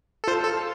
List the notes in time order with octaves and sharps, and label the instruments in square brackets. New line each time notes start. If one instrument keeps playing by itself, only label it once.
[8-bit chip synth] A4
[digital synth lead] F4 [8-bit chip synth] C5
[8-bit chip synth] A4